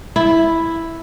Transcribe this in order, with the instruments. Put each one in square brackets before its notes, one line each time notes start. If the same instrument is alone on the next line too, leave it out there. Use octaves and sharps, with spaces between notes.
[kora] E4